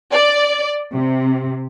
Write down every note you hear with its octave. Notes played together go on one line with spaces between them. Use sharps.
D5
C3